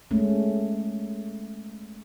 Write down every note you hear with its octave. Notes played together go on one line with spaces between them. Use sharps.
G#3 A3 C#4